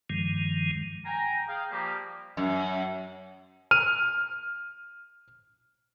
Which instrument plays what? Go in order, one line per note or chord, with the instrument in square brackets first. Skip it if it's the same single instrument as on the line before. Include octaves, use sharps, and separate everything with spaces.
[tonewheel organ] G2 D#3 F3 G#3
[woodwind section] G5 G#5 A#5
G#4 F5 G5
F3 G3 A#3 G4
[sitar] F#2
[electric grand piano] F6 D#7